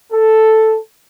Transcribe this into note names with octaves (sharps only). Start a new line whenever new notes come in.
A4